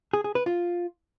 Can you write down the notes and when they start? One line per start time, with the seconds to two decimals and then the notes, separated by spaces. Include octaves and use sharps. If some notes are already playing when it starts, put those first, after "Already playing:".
0.13 G#4
0.24 G#4
0.35 B4
0.46 F4